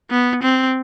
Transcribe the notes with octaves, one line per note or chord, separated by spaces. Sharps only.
B3
C4